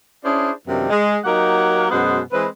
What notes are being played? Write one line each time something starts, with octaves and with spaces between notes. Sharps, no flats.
C#4 D4 E4 G#4 C5 D5
F#2 C3 D#3 F3 G3 B3
G#3
F#3 A#3 D#4 G4 A#4 F#5
F#2 B2 G#3 B3 C5 F#5
E3 G#3 C4 B4